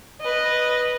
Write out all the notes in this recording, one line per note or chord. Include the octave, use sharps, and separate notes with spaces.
B4 D#5